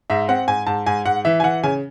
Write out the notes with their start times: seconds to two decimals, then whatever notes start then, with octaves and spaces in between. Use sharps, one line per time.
0.10 G#2 E5
0.29 C4 F#5
0.48 G#2 G#5
0.67 G#2 A5
0.86 G#2 G#5
1.05 G#2 F#5
1.25 E3 E5
1.40 G#5
1.44 E3 F#5
1.63 C#3 G#5